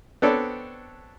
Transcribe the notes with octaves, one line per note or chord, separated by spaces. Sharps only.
B3 C4 D4 A4 C#5 D5